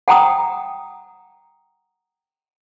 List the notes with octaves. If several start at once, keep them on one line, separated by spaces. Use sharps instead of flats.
F#5 G5 A#5 D#6